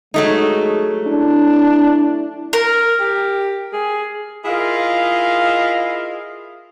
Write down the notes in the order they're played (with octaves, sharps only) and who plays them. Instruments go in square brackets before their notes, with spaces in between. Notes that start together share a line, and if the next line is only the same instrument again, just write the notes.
[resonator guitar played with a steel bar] F#3 A3 D#4 [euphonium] G#3
[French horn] D4 [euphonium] E4
[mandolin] A#4
[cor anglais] G4
G#4
[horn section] E4 F4 G#4 A#4 D#5 F5